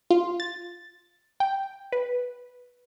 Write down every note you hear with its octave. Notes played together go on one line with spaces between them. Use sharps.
F4
A6
G5
B4